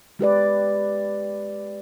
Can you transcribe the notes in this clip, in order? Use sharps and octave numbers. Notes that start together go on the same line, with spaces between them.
G#3 G4 B4 D5